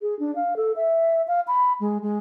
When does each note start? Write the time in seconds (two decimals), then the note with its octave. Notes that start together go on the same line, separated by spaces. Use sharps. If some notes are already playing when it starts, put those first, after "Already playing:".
0.01 G#4
0.19 D4
0.35 F5
0.56 A4
0.76 E5
1.28 F5
1.47 B5
1.80 G#3
2.02 G#3